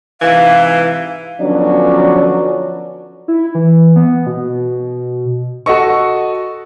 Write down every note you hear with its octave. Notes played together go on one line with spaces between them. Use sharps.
G#2 C3 E3 F5
D3 F3 F#3 B3 C#4 D4
E4
E3
B3
B2
F#4 A4 D#5 C#6